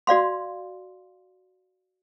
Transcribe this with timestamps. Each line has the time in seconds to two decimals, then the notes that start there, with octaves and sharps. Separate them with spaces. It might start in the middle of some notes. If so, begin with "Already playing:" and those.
0.07 F#4 D5 F5 C6